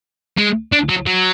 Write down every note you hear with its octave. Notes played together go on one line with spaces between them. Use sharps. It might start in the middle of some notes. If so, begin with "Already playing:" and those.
G#3
D4
F#3
F#3